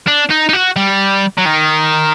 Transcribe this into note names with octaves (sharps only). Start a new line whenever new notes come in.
D4
D#4
D#4
F#4
G3
F#3
D#3